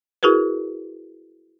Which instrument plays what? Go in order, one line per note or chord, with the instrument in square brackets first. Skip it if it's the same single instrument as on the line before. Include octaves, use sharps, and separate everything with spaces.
[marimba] E4 F#4 G#4 A#4 B4